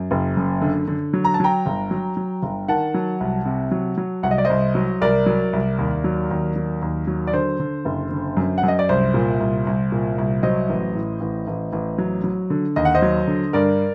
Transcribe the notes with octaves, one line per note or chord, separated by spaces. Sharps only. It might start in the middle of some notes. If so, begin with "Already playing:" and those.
Already playing: F#2
F#1
F#2
D3
D3
F#3
A#5
A5
F#3 G5 A#5
G1
F#3
F#3
G1
D#3 F#5 A5
F#3
C2
C3
F#3
F#3
C2 F#5
D#5
D5
C2 C5 D#5
F#3
C2 A#4 D5
F#3
C2
D#2
F#3
D#2
F#3
D#2
F#3
D5
D3 C5
D3
F#1
D3
F#2
F#5
F#2
D#5
D5
C2 C5
A#2
C2
C2
A#2
C2
F#3 C5 D#5
A1
A2
A1
A1
A1
F#3
F#3
D3
D#2 D#5
F#5
C5 D#5
F#3
D3
G2 A#4 D5